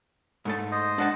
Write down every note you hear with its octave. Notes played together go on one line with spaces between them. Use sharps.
G#2 A3 A5
C5 D#5
D4 F#5 A5